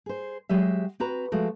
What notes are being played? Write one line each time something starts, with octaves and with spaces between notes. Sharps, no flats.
G#4 C5
F#3 G#3 G4 E5
C4 F#4 B4 A#5
F3 G#3 A3 F#4